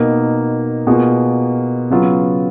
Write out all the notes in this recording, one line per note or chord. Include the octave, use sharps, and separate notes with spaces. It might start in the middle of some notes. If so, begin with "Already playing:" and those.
Already playing: B2 A#3 D#4
B2 A#3 F4 G#4
C#3 F#3 B3 F4